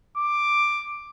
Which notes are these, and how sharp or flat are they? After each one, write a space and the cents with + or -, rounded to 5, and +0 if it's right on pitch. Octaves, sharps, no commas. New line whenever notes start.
D6 +5